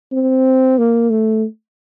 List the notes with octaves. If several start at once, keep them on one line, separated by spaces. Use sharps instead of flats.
C4
A#3
A3